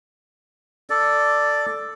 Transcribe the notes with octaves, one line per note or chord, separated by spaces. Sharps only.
A4 D5